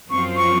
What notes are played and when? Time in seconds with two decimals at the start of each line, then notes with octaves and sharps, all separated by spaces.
0.11 F#2 F3 C4 F4 C#6
0.37 C#6